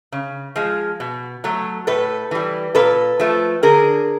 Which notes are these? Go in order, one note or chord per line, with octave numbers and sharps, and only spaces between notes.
C#3
F3 G#3
B2
F#3 A3
A2 A4 B4
E3 G3
A#2 A4 B4
F3 A3
D3 G#4 A#4